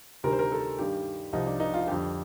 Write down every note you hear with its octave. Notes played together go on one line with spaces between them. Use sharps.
D2 C3 D#3 G3 A#4
C5
A#4
A4
G2 D#3 G3 G4
C2 C3 F3 D#4
D4
D#4
F4
F2 D3 G3 G4